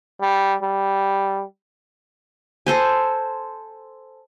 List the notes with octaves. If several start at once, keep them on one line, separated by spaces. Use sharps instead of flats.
G3
G3
A4 C5 G#5